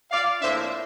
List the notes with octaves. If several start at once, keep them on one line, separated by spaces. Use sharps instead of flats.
D5 F5
A2 F3 A#3 D4 C5 E5